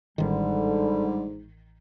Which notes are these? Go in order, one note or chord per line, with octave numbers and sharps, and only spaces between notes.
A1 G#2 D3 D#3 G3